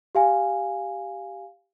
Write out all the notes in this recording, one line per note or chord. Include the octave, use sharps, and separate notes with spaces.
G4 F5 G#5